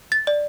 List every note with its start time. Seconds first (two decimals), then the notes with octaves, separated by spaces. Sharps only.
0.12 A6
0.27 D5